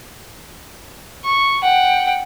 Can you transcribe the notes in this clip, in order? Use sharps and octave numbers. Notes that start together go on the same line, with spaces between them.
C#6
F#5 G5